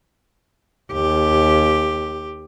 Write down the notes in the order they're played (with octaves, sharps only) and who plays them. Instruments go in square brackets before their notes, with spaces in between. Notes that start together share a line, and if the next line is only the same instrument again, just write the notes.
[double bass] D#2 [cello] G4